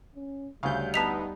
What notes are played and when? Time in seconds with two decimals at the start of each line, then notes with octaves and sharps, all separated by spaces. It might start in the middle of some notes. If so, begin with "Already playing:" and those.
0.15 C#4
0.63 D2 C#3 G3 F5 G6
0.94 B3 D#4 A5 B6 F7